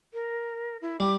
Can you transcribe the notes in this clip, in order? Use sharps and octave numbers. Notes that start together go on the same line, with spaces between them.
A#4
E4
G3 D6